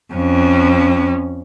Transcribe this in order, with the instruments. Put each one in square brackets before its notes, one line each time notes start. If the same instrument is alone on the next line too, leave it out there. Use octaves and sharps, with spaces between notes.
[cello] F2 C#4